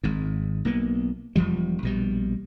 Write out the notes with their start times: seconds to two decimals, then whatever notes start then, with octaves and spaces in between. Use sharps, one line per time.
0.03 G#1 G#2
0.65 B1 A#3 B3
1.36 E1 C2 F3 G3
1.83 A#1 B2 G3